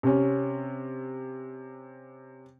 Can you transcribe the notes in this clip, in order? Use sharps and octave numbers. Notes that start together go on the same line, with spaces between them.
C3 C#4